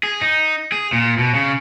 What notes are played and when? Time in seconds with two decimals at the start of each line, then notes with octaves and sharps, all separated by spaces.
0.03 G#4
0.21 D#4
0.72 G#4
0.93 A#2
1.19 B2
1.34 C#3